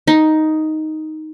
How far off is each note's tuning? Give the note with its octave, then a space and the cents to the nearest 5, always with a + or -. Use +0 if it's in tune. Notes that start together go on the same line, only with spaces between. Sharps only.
D#4 +5